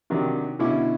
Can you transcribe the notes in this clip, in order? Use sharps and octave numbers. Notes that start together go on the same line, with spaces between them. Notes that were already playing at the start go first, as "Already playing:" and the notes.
C3 D#3 F#3 D4 G4
B2 D3 C#4 E4 D6